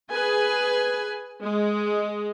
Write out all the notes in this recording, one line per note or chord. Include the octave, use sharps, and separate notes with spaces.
G#4 B4 G#5
G#3